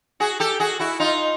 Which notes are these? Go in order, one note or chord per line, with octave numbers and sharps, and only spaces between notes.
F#4 G#4
G4 A4
F#4 G#4
E4 F#4
D#4 F4